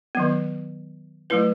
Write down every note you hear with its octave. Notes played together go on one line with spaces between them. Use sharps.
D#3 F#3 B3
F#3 A3 E4 B4